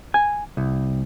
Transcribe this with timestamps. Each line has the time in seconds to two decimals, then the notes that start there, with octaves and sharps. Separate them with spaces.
0.14 G#5
0.57 C2